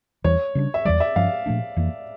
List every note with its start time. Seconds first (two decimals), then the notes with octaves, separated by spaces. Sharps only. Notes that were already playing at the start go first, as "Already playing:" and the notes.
0.24 E2 E3 G3 C#5
0.55 C#3 G3 D4
0.74 E5
0.85 E2 E3 G3 D5
1.00 E5
1.16 G2 F3 C#4 F5
1.46 A#2 F3 A3 D4
1.76 F2 E3 A#3